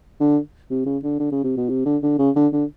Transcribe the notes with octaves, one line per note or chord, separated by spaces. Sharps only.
D3
C3
C#3
D3
D3
C#3
C3
B2
C3
D3
D3
C#3
D3
D3